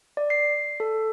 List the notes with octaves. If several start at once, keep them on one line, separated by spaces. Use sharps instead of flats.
D5
C7
A4